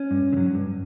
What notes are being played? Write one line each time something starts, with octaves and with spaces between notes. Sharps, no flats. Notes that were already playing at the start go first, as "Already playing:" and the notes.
Already playing: C#4
G2
D3
F#3
G2